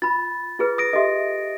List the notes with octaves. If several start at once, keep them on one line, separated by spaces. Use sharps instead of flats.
F4 B5 A6
F4 G#4 B4
D#6 A#6 D7
G4 A4 D#5 E5